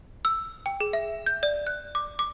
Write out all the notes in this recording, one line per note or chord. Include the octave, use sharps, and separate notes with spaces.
E6
G5
G#4
E5
G6
D5
F#6
D6
D6